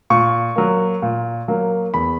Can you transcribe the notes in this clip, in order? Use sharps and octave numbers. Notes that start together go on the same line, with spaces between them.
A#2 C#6
F#3 A#3
A#2
F#3 A#3
E2 B5